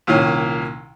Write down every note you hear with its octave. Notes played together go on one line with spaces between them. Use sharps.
C2 A#2 D#3 C#4